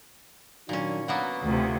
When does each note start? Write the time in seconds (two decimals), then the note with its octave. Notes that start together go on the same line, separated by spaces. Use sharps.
0.69 A#2 D#3 F#3 C#4 D4
1.08 F#3 A#3 B3 B4
1.46 D2 C3 F4